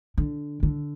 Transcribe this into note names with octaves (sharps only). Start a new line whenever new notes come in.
D3
D3